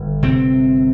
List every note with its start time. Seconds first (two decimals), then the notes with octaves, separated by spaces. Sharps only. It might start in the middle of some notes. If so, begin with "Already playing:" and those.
Already playing: G1 D3
0.23 C3 C4